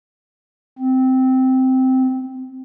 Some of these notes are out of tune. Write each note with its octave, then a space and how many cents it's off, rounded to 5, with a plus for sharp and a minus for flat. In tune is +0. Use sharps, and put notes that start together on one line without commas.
C4 -10